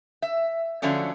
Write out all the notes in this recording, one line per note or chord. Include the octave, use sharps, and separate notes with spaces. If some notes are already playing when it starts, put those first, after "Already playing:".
E5
D3 F3 F#3 A3 C#4 D4